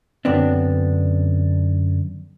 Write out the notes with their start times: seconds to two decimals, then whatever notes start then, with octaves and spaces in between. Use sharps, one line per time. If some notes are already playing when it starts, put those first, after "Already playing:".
0.25 F#2 D3 B3 C4 D4